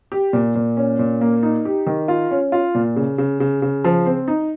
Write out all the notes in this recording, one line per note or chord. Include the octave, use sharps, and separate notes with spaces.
G4
A#2
A#2
C#4
A#2
A#3
D#4
G4
D#3
F4
C#4
F4
A#2
C#3
C#3
C#3
C#3
F3
C4
D#4